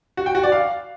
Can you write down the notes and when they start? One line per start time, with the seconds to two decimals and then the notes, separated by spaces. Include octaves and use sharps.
0.17 F#4
0.26 G5
0.35 F#4
0.43 D5
0.52 F5